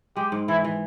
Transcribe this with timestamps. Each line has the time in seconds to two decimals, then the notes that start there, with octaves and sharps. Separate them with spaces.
0.16 G#3 G4
0.32 G#2
0.48 E3 E4
0.64 E3